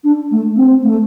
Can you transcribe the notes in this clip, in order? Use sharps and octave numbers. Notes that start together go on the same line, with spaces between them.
D4
A3
C4
A3